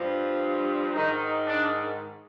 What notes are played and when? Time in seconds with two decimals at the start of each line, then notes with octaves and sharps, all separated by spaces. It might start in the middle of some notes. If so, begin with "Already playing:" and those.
Already playing: G2 F3
0.94 G#2 D#3 D#4
1.47 D4